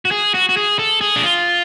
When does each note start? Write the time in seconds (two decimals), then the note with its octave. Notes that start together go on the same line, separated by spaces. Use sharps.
0.05 F#4
0.11 G#4
0.34 F#4
0.49 F#4
0.57 G#4
0.79 A4
1.01 G#4
1.16 D4
1.24 F4